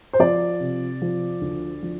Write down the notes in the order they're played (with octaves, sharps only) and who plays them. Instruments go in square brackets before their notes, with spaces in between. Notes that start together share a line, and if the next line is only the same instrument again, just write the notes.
[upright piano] C5
F3 D5
C3
F3
D2
F3